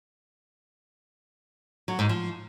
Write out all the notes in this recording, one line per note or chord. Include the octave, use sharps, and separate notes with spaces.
F#3
G#2
F3